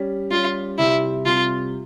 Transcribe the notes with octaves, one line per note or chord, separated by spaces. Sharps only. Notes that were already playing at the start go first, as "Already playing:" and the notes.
Already playing: G3 C#4 G4
G3 C#4 F4 G4
C3 G3 C4 E4 G4
C3 G3 C4 F4 G4